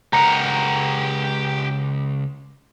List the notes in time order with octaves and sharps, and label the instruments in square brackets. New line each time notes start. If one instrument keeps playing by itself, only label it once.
[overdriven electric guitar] C#2 A#4 [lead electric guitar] G4 F#5 [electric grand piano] A#5